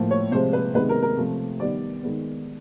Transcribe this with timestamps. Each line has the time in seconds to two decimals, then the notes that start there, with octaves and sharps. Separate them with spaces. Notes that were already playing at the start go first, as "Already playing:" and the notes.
Already playing: A2 F3 A#3
0.11 C#5
0.31 C3 F3 G#3 C5
0.53 B4
0.74 C3 D#3 G#3 B3 B4
0.89 A#4
1.03 A#4
1.17 C3 F3 A3
1.60 D#3 G3 B3 D5
2.03 D#3 G#3 B3